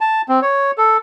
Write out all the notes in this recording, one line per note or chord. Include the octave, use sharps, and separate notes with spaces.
A5
C4
C#5
A4